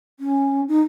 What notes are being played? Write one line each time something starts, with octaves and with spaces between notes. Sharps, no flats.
C#4
D#4